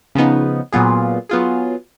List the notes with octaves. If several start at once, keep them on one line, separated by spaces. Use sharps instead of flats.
C#3 F3 B3 D#4
A#2 F#3 B3 F4 G#4
F#3 B3 F4 G#4